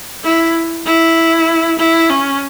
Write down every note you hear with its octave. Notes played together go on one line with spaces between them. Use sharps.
E4
E4
E4
C#4